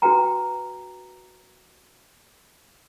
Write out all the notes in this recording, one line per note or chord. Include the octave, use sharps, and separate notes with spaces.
D4 F#4 B4 G5 A#5